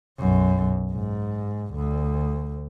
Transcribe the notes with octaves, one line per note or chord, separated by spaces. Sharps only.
B1 F#2
G#2
D2